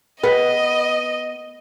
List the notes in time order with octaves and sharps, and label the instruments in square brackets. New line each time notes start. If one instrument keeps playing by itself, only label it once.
[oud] B3 [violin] D#5